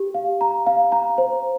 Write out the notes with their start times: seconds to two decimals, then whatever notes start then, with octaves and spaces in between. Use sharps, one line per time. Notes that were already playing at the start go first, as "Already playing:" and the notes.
Already playing: G4
0.14 F5
0.41 A#5
0.67 F5
0.92 A#5
1.18 C5